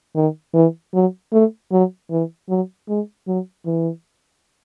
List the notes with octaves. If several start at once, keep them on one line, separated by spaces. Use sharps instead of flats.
D#3
E3
F#3
A3
F#3
E3
F#3
G#3
F#3
E3